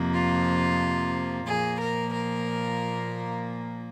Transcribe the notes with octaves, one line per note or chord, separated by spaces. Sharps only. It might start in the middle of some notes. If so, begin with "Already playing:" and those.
Already playing: F2 C3 F3 A#3
F4
A#2 F3 A#3 G#4
A#4
A#4